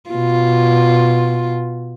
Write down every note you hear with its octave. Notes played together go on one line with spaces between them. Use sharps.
B2 F4